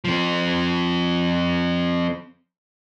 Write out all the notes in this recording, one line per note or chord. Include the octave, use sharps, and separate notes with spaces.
F3 C4